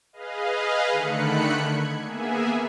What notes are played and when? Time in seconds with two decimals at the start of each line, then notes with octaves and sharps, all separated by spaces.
0.13 G#4 B4 D#5 F5
0.92 D3 D#3 A3 B5 F#6 C#7
1.68 G#6
2.03 A#3 B3 G#4 E5 G#5